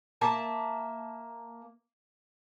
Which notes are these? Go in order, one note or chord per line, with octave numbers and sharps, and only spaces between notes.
A#3 E5 A5